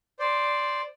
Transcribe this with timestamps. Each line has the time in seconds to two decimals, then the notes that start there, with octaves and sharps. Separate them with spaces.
0.19 C5 D5